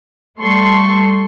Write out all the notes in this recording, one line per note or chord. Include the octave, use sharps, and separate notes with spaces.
G3 A3 A4 C6 C#6